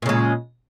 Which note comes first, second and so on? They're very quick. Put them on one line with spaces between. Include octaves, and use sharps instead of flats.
A#2 C#3 G#3